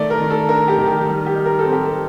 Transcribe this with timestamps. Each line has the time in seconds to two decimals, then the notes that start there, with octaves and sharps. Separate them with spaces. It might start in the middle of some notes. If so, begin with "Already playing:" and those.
Already playing: D#3 A3 D5
0.10 A#4
0.20 D#3
0.30 A4
0.49 D4 A#4
0.68 G4
0.78 D#3
0.87 G4
1.07 G3
1.27 G4
1.36 D#4
1.46 A#4
1.59 A4
1.65 C4
1.72 G4
1.86 A4